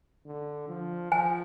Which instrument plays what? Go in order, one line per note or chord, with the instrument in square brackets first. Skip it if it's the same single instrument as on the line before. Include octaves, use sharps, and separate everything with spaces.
[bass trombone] D3
F3
[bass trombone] F3 [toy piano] G#5